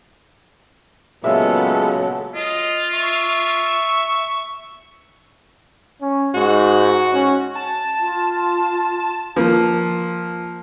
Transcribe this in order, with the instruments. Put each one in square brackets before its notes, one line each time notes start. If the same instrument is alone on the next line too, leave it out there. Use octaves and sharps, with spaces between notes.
[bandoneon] A#2 G#3 [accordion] C#3 F#3 [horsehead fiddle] B3 A4 [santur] E5 F5
[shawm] F4 [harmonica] D#5
[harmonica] E5 C#6
[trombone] C#4
[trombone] G#2 [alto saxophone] F#4
[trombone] C#4
[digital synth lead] A5
[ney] F4
[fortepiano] F3 A#3